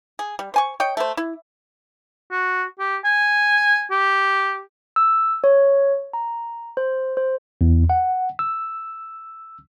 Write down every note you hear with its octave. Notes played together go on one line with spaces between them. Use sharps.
G#4
G3
C5 G#5 C#6
C#5 D#5 G5
A3 C5
E4
F#4
G4
G#5
G4
E6
C#5
A#5
C5
C5
E2
F#5
E6